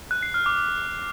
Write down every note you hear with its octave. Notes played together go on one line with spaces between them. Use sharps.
F#6
C7
F6
D6